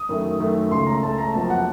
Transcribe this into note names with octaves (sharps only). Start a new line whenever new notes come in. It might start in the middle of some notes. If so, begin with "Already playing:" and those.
Already playing: D#6
F#2 D#3 A3
F#2 D#3 A3
C#2 C#3 A3 C6
A#5
C#2 C#3 A3 A5
A#5
F2 C3 F#3 A#3 A5
F#5